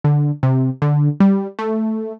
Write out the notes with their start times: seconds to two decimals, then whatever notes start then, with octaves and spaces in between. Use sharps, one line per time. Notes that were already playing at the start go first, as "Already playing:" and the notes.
0.04 D3
0.43 C3
0.82 D3
1.20 G3
1.59 A3